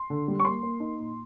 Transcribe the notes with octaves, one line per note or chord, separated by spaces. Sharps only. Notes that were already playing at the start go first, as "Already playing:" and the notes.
Already playing: C6
D3
G3
C#6
A#3 C6
A#3
D#4
A#2